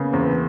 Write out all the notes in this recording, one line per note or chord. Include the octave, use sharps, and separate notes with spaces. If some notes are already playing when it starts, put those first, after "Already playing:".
Already playing: C#3 A#3 B3
E2 C4